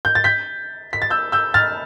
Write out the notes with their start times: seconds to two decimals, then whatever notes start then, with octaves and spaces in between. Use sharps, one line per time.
0.05 G6
0.15 A6
0.24 G6 B6
0.93 B6
1.02 A6
1.10 E6 G6
1.32 E6 G6
1.54 F6 A6